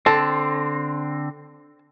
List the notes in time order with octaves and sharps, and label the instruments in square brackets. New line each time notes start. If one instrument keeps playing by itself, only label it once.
[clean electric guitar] D3 C4 [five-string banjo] A4